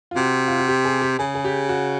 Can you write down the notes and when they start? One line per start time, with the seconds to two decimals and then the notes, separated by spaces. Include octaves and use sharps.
0.11 F4
0.16 C3 F#4
0.48 F4
0.58 F#4
0.68 G4
0.85 G#4
1.02 G4
1.19 C#3 G#4
1.35 G#4
1.45 G4
1.69 F#4